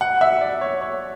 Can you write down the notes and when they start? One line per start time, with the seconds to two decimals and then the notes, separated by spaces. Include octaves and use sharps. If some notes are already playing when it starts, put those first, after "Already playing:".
0.01 F#5
0.21 E5
0.41 D5
0.61 C#5
0.81 C#5